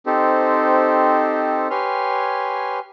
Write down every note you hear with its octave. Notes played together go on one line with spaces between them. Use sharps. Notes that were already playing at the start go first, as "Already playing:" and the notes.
C4 D#4 G4 A4 C5
G4 B4 C#5 G#5 C6 F6